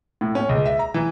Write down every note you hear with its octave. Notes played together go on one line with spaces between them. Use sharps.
A2
C#4
C#2
E5
A#5
E3